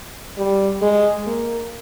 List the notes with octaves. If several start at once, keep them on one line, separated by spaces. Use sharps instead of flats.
G3
G#3
A#3